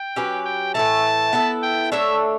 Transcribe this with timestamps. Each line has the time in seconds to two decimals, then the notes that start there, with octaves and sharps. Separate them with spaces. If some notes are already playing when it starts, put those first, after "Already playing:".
Already playing: G5
0.16 F#3 C#4 G4 B4
0.45 G5
0.74 A2 E3 A3 A5
1.33 B3 E4 A4
1.63 G5
1.92 A3 D4 A4 C#5 E5